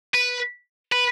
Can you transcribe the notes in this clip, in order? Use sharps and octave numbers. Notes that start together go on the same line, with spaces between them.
B4
B4